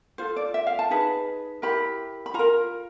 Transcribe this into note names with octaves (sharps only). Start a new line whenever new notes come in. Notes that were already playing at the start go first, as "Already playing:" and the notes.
F4 A4 C5
D5
E5
F5
A5
D#4 G#4 B4
E4 G4 A#4 B5
B5
F4 A#4 A#5